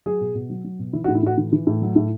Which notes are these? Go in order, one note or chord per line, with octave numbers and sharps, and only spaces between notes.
F#3 G#4
B2
B2
F#3
F#3
B2
E3 E4
F#4
A2
E4
A2 F#4
E3
E3
A2
F#3
A2